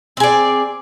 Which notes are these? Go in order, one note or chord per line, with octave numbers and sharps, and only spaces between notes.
C4 G#4 D5